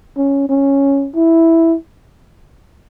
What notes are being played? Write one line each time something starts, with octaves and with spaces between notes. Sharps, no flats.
C#4
C#4
E4